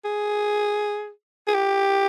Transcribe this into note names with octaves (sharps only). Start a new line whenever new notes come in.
G#4
G#4
G4